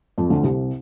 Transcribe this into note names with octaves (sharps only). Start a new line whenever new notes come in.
F2 F3
D2 D3
C2 C3